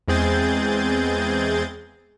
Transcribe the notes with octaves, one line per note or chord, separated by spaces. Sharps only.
E2 G#3 C4 G#4 G6 A6